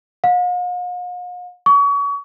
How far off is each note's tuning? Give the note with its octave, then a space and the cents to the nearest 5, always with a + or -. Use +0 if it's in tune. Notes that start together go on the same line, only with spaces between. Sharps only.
F5 +45
C#6 +35